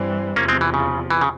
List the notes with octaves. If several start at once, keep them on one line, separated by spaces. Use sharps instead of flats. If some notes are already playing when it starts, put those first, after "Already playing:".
Already playing: G2 E3 G3 C4
E2 C3 F3 A#3 C#4
G#3 C4
E3
C#3
E3
C#3